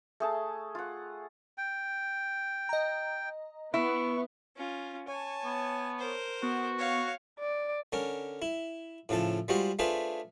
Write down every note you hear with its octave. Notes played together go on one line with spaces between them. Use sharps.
A3 G#4 A5
F4 F#5
G5
D#5 A#5
B3 E4 C#6
C#4 F4
C#5 G#5 A5
B3
A#4 C5
B3 F#4
C#5 F5
D5
D3 C#4 A#4
E4
A2 C#3 F3 A4
G3 G#3 F4 F#4 C5 D#5
A3 D4 F4 G#4 B4 C5